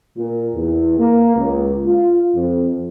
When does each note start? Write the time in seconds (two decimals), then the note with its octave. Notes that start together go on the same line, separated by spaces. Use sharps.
0.17 A#2
0.55 E2
0.99 A#3
1.37 C#2
1.87 F4
2.36 F2